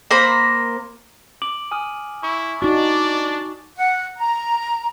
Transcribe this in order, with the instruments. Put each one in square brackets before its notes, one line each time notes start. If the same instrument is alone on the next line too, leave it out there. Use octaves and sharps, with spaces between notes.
[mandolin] A#3 C5 A#5 B5
[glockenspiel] D6 D7 F#7
G#5 D#6 F6
[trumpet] E4 [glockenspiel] C#6
[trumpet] D4 [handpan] D#4 F#4 [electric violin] D5 [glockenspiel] C#6
[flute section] F#5
A#5